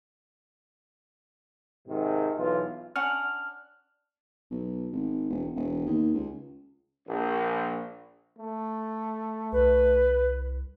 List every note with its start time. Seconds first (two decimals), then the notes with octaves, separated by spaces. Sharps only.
1.88 G#2 C3 D#3
2.38 B1 E3 F4
2.96 C#4 D4 F#5 F6
4.51 B1
4.92 G#1
5.30 E1
5.55 E1
5.86 D#2
6.14 C#2
7.08 A#1
8.38 A3
9.52 C2 B4